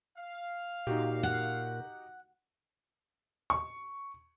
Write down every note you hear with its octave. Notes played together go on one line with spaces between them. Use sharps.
F5
A#2 D#4 F#4 G4
F#5
C#6